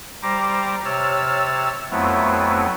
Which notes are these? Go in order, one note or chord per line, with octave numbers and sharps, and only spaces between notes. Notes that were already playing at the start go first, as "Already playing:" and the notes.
G3 C5 A#5 D6 A#6
C3 C#5 E6 F6 A6
F2 F#3 A3 B3 C4 E4